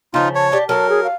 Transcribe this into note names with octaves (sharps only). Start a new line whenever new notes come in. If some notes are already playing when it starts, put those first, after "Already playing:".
C#3 F3 D#4 F4
C#5 A5
G4 D5 A5
F#3 A4 A#4 A5
G#4
F5